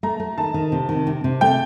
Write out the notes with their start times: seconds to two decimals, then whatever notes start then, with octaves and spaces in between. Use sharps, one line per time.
0.03 A3 A#5
0.20 A3
0.38 D#3 A5
0.54 D#3
0.72 C3
0.89 D#3
1.07 C3
1.24 C3
1.41 A3 G5